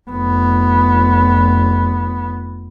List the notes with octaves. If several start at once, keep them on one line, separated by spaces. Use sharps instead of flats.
F1 B3